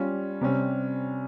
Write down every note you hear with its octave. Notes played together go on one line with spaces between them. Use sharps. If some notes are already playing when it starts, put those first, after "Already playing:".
Already playing: G3 C#4 F4
C3 G3 C#4